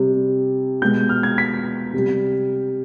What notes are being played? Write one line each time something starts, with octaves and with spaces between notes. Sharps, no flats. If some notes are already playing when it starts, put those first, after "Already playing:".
Already playing: C3 G3
B2 G#3 G6
F6
G#6
B6
C3 G3